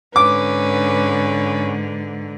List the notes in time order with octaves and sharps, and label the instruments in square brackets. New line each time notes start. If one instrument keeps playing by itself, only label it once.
[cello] G#2 D3 [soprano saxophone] C#4 [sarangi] B4 [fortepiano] D6